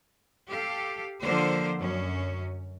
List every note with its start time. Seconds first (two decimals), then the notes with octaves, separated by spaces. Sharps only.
0.50 G4 A4 F5
1.20 D3 F3 A#3 C5
1.79 F#2 C#4